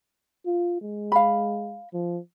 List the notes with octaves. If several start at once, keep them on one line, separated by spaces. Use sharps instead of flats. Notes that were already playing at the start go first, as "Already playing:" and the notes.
F4
G#3
F5 B5
F3